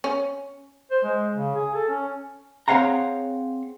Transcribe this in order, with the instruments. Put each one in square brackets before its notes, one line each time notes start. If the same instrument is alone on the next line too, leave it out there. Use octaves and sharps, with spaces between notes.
[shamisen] C#4
[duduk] C5
G#3
C#3
G#4
A4
C#4
[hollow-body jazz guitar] C4 G#4 C#5 F5 F#5 A#5